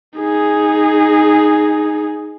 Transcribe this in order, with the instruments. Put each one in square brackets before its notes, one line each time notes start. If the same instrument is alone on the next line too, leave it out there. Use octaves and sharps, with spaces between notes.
[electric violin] D#4 G#4